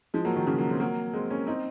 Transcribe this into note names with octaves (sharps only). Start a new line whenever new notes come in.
F3 G#3
F#3 A#3
D#3 F#3
C#3 F3
F#3 A#3
G#3 C4
F#3 A#3
G#3 C4
A#3 C#4
C4 D#4